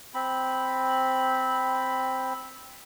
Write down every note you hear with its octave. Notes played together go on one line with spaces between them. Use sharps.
C4 B5